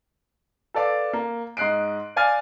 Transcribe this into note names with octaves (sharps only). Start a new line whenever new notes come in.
A4 B4 D5 F5 D6
A#3
G#2 D#5 F#6 C7 D7
D5 F5 G#5 D6 F6 A6